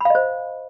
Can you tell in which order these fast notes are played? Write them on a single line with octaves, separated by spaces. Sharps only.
B5 F5 D#5 C5